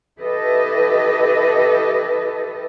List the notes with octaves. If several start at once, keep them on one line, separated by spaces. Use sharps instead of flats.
E4 G4 A4 B4 D#5